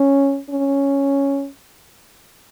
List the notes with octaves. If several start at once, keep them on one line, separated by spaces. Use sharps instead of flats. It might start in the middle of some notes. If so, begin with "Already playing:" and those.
Already playing: C#4
C#4